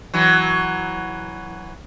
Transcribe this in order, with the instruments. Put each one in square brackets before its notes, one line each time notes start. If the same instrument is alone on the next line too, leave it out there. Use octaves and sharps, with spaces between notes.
[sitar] E3 F#3